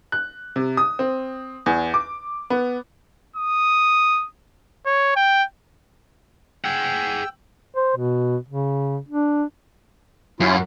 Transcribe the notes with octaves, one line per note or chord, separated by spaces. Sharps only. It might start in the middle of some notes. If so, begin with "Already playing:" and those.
F#6
C3
D#6
C4
E2
D6
B3
D#6
C#5
G5
G#4 F#5 G5 E6
C5
B2
C#3
D4
F#2 C#4 E4 F4